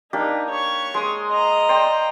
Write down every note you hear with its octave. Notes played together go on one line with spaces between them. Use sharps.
A#3 D4 D#4 G4
C#5 C#6
G#3 C6 D#6
D#5 A#5
C5 D5 G5